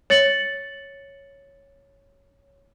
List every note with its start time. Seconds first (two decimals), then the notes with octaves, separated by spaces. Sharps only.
0.10 C#5 A6 C#7 F#7